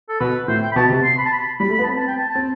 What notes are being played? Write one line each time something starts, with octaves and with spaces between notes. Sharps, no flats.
A4
B2 B4
A2 C5
G5
B5
B2 A5
C3
C6
B5
A5
B5
G3 B5
A3
B3 B5
A5
C4 B5
A5
G5
A5
A5
C4